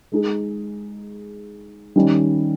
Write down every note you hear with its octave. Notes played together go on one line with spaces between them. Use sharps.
G#3 D#4 G#4
D#3 G3 C#4